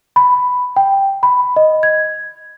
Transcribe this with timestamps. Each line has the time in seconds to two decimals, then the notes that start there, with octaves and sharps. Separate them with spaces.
0.16 B5
0.76 G5
1.23 B5
1.56 D#5
1.83 G#6